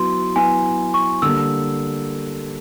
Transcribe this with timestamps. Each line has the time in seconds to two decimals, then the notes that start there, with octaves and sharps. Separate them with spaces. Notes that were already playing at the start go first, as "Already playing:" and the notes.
Already playing: F#3 B3 E4 C6
0.36 F#3 B3 E4 G#5
0.94 C#6
1.22 D3 G3 A#3 E6